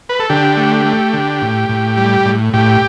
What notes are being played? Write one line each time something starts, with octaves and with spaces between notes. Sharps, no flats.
B4
A4
D3 G4
A3
A3
D3
A2
A2
G3
A2
A2 G4